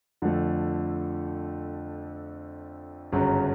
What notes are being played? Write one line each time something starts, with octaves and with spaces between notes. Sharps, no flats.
F2 D3 F3 A3
G1 F#2 C#3 F#3